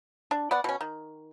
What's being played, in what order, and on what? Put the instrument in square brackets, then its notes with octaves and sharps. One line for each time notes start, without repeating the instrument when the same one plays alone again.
[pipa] D4
B3 D5 F#5
B2 C#4
D#3